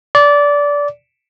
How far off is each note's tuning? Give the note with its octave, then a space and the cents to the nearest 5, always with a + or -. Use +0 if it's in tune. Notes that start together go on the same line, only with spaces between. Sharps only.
D5 -20